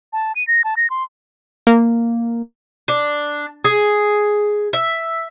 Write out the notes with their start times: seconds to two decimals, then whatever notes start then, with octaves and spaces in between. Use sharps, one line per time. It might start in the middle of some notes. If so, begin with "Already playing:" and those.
0.13 A5
0.36 D#7
0.47 A#6
0.64 A5
0.77 A#6
0.90 C6
1.67 A#3
2.88 D4
3.65 G#4
4.73 E5